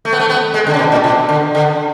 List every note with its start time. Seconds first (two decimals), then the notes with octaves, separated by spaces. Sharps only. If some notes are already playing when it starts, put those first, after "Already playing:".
0.05 A3
0.13 B3
0.20 A3
0.30 B3
0.54 G#3
0.67 D3
0.74 C#3
0.79 B2
0.92 A2
1.04 B2
1.29 D3
1.55 D3